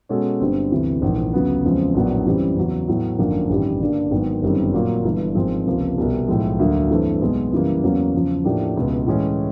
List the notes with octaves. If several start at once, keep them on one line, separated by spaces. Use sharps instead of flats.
B2 G#3 C#4 F#4 A4
G1 G2 D3 G3 C4
D2 C3 E3
A#1 G#2 E3
D2 C#3 F#3 B3
E2 C#3 F3 G#3 C4
A#1 A2 F#3 B3 D4
F#2 C#3 E3 G3 C4
E2 C#3 F#3
A2 F#3 B3 E4
G#1 F#2 D3 F3 A#3
A1 G2 D#3 G3
G2 D3 G3 A#3 D4
G#1 G#2 D#3 F#3 B3
G1 F#2 D#3 G3 C4
A#2 F#3 A#3
G1 G2 E3
G#1 G#2 F3 G#3 C4
C#2 C3 F3 A#3
C2 B2 G3
B1 A2 F3 G#3
D2 D3 F#3 A#3
G2 E3 A3 C4
B1 B2 G#3 B3
F#2 C#3 E3 G3 A#3
E2 C#3 F#3 A#3 C#4
E2 C#3 F3
A2 F3 A#3 D4 G4
C#2 B2 G#3
A2 E3 G#3 C#4